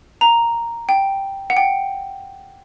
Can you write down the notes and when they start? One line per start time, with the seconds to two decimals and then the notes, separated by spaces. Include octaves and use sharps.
0.21 A#5
0.89 G5
1.50 F#5
1.57 G5